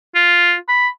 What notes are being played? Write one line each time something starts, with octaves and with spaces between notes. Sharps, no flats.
F4
B5